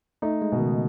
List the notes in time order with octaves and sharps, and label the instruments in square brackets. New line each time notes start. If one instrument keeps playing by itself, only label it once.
[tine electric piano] A3 [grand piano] D#4
[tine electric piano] G#3
[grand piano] B2
[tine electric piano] D#3
C#3